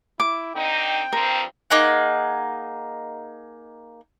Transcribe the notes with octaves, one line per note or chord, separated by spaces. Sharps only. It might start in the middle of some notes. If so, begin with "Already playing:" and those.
E4 D6
D3 C4 D#4 G5
G2 F3 C4 A#4
A#3 D#4 G#4 F#5